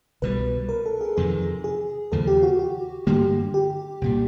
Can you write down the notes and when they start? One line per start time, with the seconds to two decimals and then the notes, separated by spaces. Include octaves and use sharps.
0.22 C2 B2 G3 B4
0.69 A#4
0.86 A4
1.01 G#4
1.17 F2 C3 D#3 G#4
1.64 G#4
2.12 D#2 C#3 F3 A4
2.27 G4
2.43 F#4
2.59 F#4
3.07 G2 D3 G3 A#3 G4
3.54 G4
4.02 C2 A#2 G3